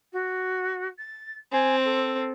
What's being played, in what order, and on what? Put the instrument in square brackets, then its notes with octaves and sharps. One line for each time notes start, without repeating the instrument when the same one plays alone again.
[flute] F#4
A6
[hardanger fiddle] C4 [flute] G#5
[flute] A4